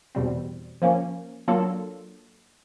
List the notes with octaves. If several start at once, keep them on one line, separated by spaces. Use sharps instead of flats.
E2 B2 G3 C4
F3 A#3 C#4
F#3 A#3 D4 F4 A4